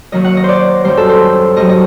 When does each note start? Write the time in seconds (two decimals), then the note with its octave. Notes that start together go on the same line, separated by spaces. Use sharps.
0.12 D#2 D#3 F#3 D#5
0.25 F#5
0.37 D#5
0.44 C5 D5
0.84 F#2 D#3 G3 C5
0.97 A4
1.09 C5
1.57 G2 D#3 F#3 D#5
1.69 D#5